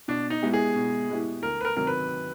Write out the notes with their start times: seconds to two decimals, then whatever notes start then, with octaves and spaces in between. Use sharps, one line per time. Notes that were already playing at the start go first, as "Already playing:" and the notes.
0.08 B2 D4
0.30 D#4
0.42 G#3 B3 E4 G4
0.53 G#4
0.76 B2
1.09 G#3 B3 E4 G4
1.42 D2 A#4
1.61 B4
1.65 A#4
1.76 C3 D#3 F#3 A#4
1.87 B4